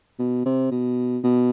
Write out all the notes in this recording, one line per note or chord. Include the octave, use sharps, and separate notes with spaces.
B2
C3
B2
B2